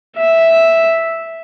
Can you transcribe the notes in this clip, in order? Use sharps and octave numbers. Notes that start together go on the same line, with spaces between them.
E5